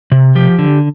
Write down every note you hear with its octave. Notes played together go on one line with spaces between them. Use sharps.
C3
F3 G4
D3